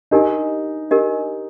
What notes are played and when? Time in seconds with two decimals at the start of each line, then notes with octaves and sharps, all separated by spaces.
0.11 D4 D#4 G4 A#4 D#5 G#5
0.91 D4 G4 A#4 D#5 G#5